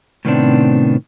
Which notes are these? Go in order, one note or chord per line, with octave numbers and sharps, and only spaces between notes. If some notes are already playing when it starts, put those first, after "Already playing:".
A2 C3 D#3 B3 C4 D4